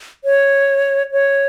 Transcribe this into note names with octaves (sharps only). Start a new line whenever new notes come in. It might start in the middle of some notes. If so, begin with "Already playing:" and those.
C#5
C#5